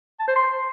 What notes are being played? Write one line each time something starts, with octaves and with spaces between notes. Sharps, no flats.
A5
C5
C6